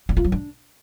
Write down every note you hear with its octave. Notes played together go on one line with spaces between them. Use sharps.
D4
F4
F#3
D4